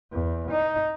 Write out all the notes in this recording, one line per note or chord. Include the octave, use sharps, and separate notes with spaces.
E2
D#4